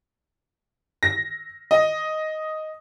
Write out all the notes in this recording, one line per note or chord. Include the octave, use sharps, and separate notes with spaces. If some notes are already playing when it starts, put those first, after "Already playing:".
A#6
D#5